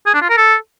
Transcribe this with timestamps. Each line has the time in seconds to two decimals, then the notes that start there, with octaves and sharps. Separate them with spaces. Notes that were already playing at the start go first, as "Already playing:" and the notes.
0.06 G#4
0.14 D4
0.22 F4
0.29 A#4
0.37 A4